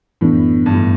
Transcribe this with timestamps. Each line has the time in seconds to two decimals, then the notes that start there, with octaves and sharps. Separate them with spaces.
0.21 F#2 A2 E3 B3 D4
0.66 G2
0.74 A2